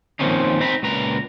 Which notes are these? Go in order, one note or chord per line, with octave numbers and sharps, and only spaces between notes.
D#3 F3 A#3 C4 C#4 D#4
C4 D#4 A#5 B5
C#2 A#2 B4 A#5